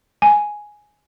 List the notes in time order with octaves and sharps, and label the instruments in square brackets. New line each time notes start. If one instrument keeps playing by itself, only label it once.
[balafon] G#5